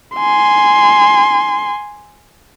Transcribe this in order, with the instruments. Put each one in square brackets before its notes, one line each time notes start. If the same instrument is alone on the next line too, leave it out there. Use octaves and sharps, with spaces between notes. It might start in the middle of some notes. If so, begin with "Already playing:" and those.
[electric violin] G#5 C6